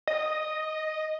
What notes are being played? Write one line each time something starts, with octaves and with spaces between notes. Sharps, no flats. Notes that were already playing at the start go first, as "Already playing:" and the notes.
D#5